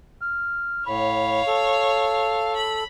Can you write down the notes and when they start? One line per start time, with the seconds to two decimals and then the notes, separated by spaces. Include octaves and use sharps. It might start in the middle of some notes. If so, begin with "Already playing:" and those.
0.21 F6
0.87 A2 C#5 F5 B5
1.47 A4
2.56 B5